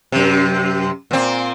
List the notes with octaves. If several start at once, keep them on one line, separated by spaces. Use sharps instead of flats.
F#2 C3
A#2 C4